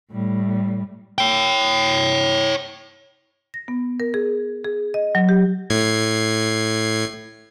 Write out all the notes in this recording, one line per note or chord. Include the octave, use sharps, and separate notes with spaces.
A2 G3
C#5 G5
A#6
B3
A#4
G#4
G#4
D#5
F#3
G4
A2 G#6 C7